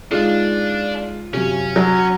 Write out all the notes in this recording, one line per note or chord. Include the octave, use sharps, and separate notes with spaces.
G#3 D4 D#4 F4
F#2 C3 C#4
F#3